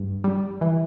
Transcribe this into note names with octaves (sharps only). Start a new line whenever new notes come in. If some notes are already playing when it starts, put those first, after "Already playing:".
Already playing: G2
G3
E3